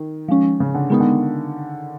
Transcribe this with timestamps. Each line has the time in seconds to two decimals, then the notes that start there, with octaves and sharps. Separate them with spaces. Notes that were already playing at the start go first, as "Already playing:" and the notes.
Already playing: D#3
0.28 F3 G#3 C#4
0.60 C#3
0.74 D3
0.90 D#3 G#3 B3 D#4
1.00 D3